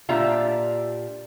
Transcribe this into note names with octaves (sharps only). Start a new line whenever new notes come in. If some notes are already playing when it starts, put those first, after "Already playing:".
A#2 D4 F4 G4 E5 A#5